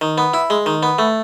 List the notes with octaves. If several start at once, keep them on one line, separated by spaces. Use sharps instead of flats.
D#3
B3
E4
G#3
D#3
B3
A3